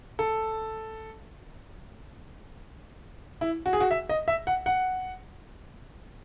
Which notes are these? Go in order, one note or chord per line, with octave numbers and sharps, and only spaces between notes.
A4
E4
F#4
G#4
F#4
E5
D#5
E5
F#5
F#5